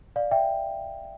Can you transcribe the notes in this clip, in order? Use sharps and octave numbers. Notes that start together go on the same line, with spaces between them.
D5 F5
E5 G5